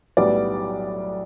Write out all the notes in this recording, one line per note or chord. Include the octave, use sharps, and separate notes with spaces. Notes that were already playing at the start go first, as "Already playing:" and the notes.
B1 A2 G3 B3 D5